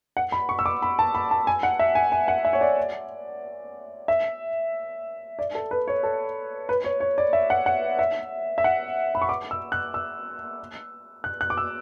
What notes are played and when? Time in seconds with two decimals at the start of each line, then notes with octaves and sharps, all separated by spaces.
0.17 F#5
0.32 B5
0.49 C#6
0.59 E6
0.66 D6
0.82 B5
0.99 A5
1.15 B5
1.31 A5
1.47 G#5
1.63 F#5
1.79 E5
1.95 G#5
2.12 G#5
2.28 F#5
2.45 E5
2.53 C#5
2.61 D5
4.08 E5
5.39 D5
5.55 A4
5.71 B4
5.87 C#5
6.03 A4
6.69 B4
6.84 C#5
7.00 C#5
7.18 D5
7.33 E5
7.50 F#5
7.66 F#5
7.99 E5
8.58 E5
8.64 F#5
9.15 B5
9.22 C#6
9.29 D6
9.51 E6
9.72 F#6
9.94 E6
11.24 F#6
11.41 F#6
11.50 D6
11.57 E6